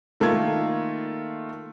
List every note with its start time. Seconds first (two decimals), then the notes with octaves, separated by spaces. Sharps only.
0.20 D#3 A3 A#3 F4 G#6